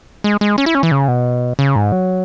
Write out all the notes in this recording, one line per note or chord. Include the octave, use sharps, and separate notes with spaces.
G#3
G#3
C#4
E4
C#4
E3
C#3
B2
C#3
G#2
F#3